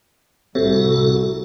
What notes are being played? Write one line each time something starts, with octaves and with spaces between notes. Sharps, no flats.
C2 A2 C3 F#4 A4